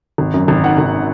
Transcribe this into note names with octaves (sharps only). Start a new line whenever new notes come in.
G#1
F#2
G#1
D#3 F#5
G#1